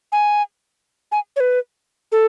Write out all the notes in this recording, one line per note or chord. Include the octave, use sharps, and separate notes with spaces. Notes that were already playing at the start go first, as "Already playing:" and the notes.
G#5
G#5
C#5
B4
A4